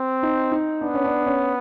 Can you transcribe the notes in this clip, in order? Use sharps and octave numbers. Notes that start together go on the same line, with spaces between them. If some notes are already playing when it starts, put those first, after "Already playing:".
Already playing: C4
D#4
D#4
B3 D4
C#4
D4
C#4